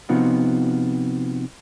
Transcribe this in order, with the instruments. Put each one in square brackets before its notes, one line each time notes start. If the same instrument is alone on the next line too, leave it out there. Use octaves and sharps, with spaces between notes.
[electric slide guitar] C3 F3 B3 D#4 F4 F#4